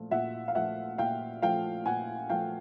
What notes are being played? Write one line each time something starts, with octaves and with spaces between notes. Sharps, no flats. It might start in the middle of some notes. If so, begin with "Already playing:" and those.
Already playing: A#2 F3 A3
A#2 E5 F#5
F5
F3 A3 E5 F#5
A#2 F5 G5
F3 A3 F5 G5
A#2 F#5 G#5
F3 A3 F5 G5